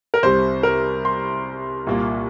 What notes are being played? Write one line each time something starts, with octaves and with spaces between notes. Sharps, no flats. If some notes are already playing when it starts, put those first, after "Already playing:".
A#4
C2 C3 G3 C5
A#4
C6
C2 A#2 A#3 F4